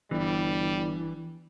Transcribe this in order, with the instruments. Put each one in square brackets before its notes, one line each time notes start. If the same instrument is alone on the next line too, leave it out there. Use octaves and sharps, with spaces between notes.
[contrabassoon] G1 [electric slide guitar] E3 [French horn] G3